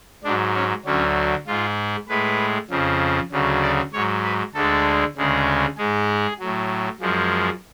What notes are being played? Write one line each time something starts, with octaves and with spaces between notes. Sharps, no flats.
G#2 F#3 D4
C#4
D2 D3 F#3 C#4
G#2 G#3 F4
A2 G#3 B4
F2 C#3 F3
D2 C#3 F#3
D5
G#2 F#3 C#5
B4
D2 D3 G#3 A4
D2 C#3 G#3
G#2 G#3 G#4
A2 F#3
F#2 F3 G#3